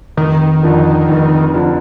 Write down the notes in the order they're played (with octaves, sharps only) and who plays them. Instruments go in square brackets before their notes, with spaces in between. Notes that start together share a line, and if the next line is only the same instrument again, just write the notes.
[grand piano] F1 [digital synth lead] D#3
[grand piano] F2 D3 F3
F1
D3 F3